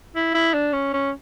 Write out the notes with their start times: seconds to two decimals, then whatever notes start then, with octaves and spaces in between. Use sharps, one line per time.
0.15 E4
0.34 E4
0.53 D4
0.73 C#4
0.93 C#4